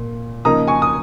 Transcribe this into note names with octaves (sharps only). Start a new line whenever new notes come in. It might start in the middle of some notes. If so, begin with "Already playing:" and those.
Already playing: A#2
C#3 F3 A#3 D#4 A#5 D#6
G#5 C#6
D#6